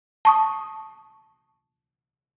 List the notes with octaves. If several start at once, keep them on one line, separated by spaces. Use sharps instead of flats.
A5 C#6 D#6